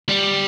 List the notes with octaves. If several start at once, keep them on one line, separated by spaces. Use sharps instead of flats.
G3